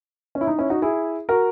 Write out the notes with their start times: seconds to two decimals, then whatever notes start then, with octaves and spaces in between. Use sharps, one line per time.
0.35 C#4
0.41 E4
0.47 D#4
0.58 C#4 E4
0.70 D#4 F#4
0.82 E4 G#4
1.29 F#4 A#4